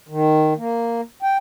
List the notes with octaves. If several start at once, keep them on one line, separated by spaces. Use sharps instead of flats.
D#3
A#3
G5